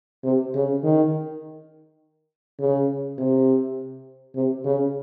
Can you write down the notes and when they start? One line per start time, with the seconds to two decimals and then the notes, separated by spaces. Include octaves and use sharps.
0.24 C3
0.54 C#3
0.84 D#3
2.60 C#3
3.18 C3
4.35 C3
4.65 C#3